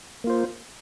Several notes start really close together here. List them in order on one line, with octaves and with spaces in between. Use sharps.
A#3 F4 C5